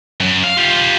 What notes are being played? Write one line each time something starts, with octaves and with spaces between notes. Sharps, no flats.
F#2
F5
F4 G4